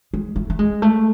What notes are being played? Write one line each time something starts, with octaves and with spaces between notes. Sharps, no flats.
G#3
A3
A3
G#3
A3